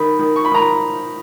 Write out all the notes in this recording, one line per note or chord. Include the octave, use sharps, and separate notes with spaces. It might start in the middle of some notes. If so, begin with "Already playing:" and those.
Already playing: D#3 B5
D#3
C#6
B5
D#3 A#5